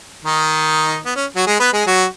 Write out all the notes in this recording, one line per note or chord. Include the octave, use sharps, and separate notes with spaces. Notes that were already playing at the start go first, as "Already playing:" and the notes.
D#3 D#4
B3
C#4
F#3 F#4
G#3 G#4
B3 B4
G#3 G#4
F#3 F#4